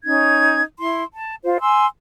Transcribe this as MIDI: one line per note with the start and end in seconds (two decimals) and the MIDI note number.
0.04 0.61 61
0.04 0.61 63
0.04 0.61 92
0.79 1.02 64
0.79 1.02 84
1.13 1.36 81
1.43 1.58 65
1.43 1.58 72
1.61 1.85 80
1.61 1.85 84
1.61 1.85 88